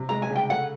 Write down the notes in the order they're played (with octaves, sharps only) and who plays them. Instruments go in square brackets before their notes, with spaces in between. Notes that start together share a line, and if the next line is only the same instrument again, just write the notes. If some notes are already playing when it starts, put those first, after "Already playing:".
Already playing: [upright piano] C3
[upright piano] G#3 [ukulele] A#5
[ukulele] G#5
[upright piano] C#3
[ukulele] G5
[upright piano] A3 [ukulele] F#5